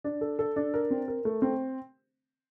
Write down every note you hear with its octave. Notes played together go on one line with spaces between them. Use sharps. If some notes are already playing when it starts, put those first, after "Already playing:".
D4
A4
A4
D4
A#4
C4
A#4
A3
C4